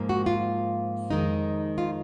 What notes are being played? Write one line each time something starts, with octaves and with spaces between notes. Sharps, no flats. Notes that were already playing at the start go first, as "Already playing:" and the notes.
Already playing: G#2 F3 A#3
F#4
F4
F2 D#3 G#3 D#4
F4